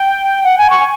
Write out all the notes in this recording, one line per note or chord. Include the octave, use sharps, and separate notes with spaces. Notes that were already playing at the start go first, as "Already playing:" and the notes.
Already playing: G5
F#5
G#5
C#6